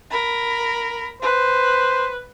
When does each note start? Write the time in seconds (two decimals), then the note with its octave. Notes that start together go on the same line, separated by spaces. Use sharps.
0.11 A#4 B5
1.22 B4 C5